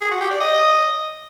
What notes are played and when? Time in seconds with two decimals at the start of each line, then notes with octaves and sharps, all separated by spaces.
0.01 G#4
0.11 F#4
0.21 G4
0.31 D5
0.40 D#5